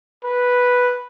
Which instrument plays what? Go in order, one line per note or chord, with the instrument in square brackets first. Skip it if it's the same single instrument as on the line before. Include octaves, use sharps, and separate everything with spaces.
[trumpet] B4